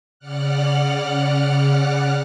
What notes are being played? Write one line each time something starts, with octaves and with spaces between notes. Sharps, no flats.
C#3 D5 F#5 F6 F#6